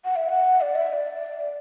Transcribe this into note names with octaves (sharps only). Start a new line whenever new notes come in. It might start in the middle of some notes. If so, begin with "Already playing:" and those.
F#5
E5
F#5
D5
E5
E5
D5